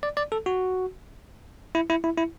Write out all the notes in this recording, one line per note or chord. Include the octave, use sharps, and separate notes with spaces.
D5
D5
A4
F#4
E4
E4
E4
E4